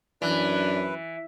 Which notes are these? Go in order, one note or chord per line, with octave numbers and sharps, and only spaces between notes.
F#2 E3 D4 B4